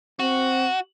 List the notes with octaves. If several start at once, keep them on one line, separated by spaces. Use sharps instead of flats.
C4 F#4